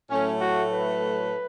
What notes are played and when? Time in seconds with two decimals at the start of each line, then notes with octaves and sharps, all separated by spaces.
0.10 A2 F#3 A3 C#4
0.41 F#4
0.72 B4